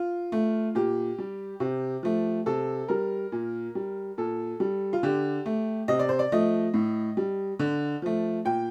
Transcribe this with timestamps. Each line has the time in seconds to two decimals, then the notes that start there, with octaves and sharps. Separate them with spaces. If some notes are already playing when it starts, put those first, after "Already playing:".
Already playing: F4
0.32 A3
0.75 A#2 G4
1.18 G3
1.60 C3
2.03 F3 A3
2.46 C3 A4
2.89 G3 A#4
3.32 A#2
3.75 G3
4.18 A#2 A4
4.60 G3
4.93 F4
5.03 D3 G4
5.46 A3
5.88 C3 D#5
5.99 D5
6.09 C5
6.19 D5
6.32 F3 A3 D#5
6.74 A2
7.17 G3
7.59 D3
8.02 F3 A3
8.45 A#2 G5